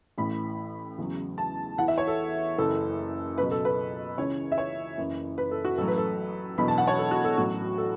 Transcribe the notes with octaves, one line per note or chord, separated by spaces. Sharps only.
A1 A2 E3 B5
E2 C#3 F#3
A5
E2 E3 F#5
E5
C#5
A4
F#1 F#2 C#3 E3 A4
C#2 B2 F#3 B4
A4
B4
C#2 C#3 E3 C#5
E5
C#5
F#1 F#2 E3
B4
A4
F#4
A1 A2 F#3 A4
B4
A4
E1 E2 B2 F#3 B5
A5
F#5
C#5
A4
F#4
A4
A1 A2 F#3 F#4
A4